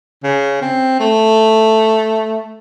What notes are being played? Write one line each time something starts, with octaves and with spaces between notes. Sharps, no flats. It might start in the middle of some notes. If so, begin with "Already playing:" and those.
C#3
C4
A3